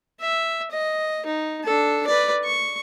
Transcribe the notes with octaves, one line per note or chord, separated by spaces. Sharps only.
E5
D#5
D#4
D4 A4
B4 D5
C#6